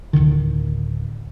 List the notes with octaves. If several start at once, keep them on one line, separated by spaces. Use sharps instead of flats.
D1 B1 D3 D#3